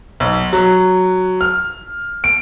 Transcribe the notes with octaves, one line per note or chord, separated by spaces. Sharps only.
B1
F#3
F6
D7